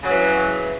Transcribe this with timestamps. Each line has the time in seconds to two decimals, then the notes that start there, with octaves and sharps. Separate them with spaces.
0.01 C#3
0.05 F#3
0.09 E3